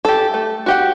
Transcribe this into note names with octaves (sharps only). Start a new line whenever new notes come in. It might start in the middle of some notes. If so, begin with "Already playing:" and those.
G4 A4
A3
F#4 G4 F#5